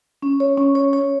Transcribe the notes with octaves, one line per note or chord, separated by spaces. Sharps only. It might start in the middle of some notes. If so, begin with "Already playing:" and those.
C#4
C#5
C#4
C#5
C#5